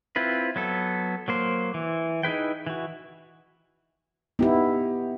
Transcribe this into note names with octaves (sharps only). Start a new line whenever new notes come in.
C4 E4 F4 B4
F#3 B3 A4
F#3 A#3 C5
E3
D#4 E4 G#4 B4 G5
E3 F#4
B3 D#4 E4 G4